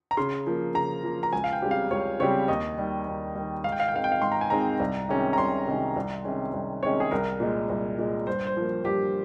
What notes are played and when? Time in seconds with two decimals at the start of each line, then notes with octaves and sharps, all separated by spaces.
0.11 A#5
0.17 C#3 C6
0.47 F3 A#3
0.74 C#3 A#5
1.04 F3 A#3
1.23 A#5
1.33 C#2 G#5
1.44 F5
1.53 G5
1.62 C#3 G3 C4 G4
1.71 F5
1.91 C#2 C#5
2.20 C#3 G3 C4 G4 C#5
2.48 D#2 D#5
2.78 D#3 G3
3.07 D#2
3.35 D#3 G3
3.64 G#2 F5
3.72 G5
3.80 F5
3.88 G5
3.94 D#3 G#3 C4 D#4 F5
4.04 G5
4.12 F5
4.22 G#2 C6
4.32 A#5
4.41 G#5
4.50 D#3 G#3 C4 D#4 A#5
4.80 C2
5.09 C3 D#3 G#3 C#4
5.33 A#5
5.38 C2 C6
5.67 C3 D#3 G#3 C#4
5.96 C2
6.25 C3 D#3 G#3 C#4
6.54 C2
6.83 C3 D#3 G#3 C#4 C#5
7.00 G#4
7.11 C2 A#4
7.40 A#2 G#3
7.69 C2
7.98 A#2 G#3
8.27 G2 C5
8.47 C5
8.57 F3 A#3
8.85 G2 G4